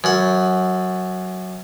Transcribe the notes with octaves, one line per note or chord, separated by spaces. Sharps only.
F#2 F#5